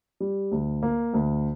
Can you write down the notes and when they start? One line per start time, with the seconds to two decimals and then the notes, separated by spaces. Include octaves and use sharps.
0.20 G3
0.52 D2
0.83 A#3
1.14 D2